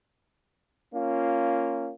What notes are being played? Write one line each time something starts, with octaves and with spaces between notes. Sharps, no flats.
A#3 C#4 F4